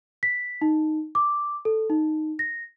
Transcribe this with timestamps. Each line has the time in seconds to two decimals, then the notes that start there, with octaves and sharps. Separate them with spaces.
0.23 B6
0.61 D#4
1.15 D6
1.65 A4
1.90 D#4
2.39 A#6